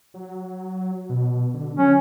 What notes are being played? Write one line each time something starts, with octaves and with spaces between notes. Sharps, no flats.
F#3
B2
D3
F#3 C#4